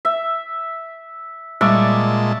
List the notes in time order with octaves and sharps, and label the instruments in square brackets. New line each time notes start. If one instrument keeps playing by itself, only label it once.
[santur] E5
[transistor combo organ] A#2 G#3 A5 [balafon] G3 B5 [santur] D5 E5 C#6